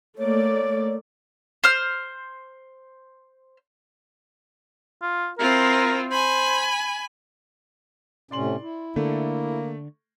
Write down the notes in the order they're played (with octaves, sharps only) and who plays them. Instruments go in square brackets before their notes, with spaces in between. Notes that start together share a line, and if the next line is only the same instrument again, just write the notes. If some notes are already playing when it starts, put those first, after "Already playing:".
[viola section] A3 A#3 D5 [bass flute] C#5
[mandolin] C5 F6
[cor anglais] F4
[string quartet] C4 E4 F4 [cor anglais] A#4
[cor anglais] C5 [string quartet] G#5 B5
[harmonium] A2 C3 C#4 [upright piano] D5 C6 F#7
[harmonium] E4
[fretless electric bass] D3 [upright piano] A3 [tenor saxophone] A#3